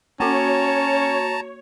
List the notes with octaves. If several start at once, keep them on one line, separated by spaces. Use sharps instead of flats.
A#3 C#4 F#4 C#5 A5 A#5